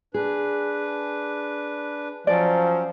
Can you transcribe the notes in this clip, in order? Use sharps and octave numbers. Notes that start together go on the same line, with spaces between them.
D4 G#4 B4
F3 F#3 C#4 D5